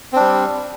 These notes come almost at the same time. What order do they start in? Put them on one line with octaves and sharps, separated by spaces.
C4 D4 G3